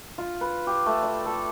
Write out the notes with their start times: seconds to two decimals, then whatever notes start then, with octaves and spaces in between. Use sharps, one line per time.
0.18 F4
0.41 B4
0.67 G4
0.86 A3
1.03 D5
1.26 A4